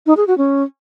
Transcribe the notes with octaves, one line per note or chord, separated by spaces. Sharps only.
D#4
G#4
F#4
C#4